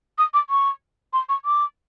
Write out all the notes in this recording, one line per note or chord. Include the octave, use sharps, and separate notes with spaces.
D#6
D6
C#6
C6
C#6
D6